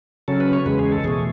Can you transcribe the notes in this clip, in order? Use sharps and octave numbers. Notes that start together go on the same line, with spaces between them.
C#3 F#3 C#4 A4
B4
C#5
E2 C#3 G#3 B4
G#4
A4
E2 B2 A3 G#4